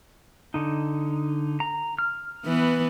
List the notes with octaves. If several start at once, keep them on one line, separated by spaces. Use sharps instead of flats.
D3 D#4
A#5
F6
E3 B3